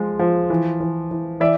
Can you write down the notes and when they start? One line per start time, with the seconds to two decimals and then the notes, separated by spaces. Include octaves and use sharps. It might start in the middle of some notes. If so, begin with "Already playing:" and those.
Already playing: F3 G#3
0.19 F3
0.50 E3
0.80 E3
1.11 E3
1.40 E3 D5 E5